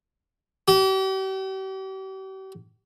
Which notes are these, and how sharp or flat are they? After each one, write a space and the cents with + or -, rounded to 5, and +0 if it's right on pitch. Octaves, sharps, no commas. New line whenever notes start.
G4 -40